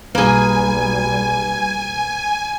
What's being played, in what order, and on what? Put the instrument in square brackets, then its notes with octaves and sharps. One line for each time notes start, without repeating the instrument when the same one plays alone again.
[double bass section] B1 G3 [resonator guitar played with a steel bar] A#3 G#4 [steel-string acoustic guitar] B4 [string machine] G#5